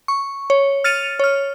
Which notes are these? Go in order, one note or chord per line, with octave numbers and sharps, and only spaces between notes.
C#6
C#5
F6 A6 C#7 D#7 F7
C#5 F6